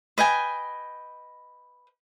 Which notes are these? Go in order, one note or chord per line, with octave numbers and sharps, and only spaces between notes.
B4 D#5 G5 G#5